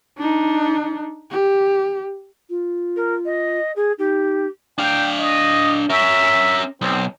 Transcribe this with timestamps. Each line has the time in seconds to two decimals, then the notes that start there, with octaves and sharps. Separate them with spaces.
0.18 D4 D#4
1.31 G4
2.50 F4
2.96 A#4
3.25 D#5
3.75 G#4
3.98 D#4 G4
4.78 D4 F5 G5
5.18 D#5
5.90 C#4 A#4 E5
6.81 B1 C4